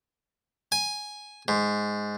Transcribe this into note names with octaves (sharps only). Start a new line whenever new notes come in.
G#5
G#2